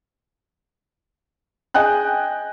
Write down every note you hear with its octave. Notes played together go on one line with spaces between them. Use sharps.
G#4 D#5 G5 G#5 F#6